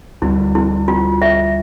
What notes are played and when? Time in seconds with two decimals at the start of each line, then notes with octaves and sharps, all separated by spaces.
0.22 D2 D3 G3 E4
0.55 E4
0.88 F4
1.22 E5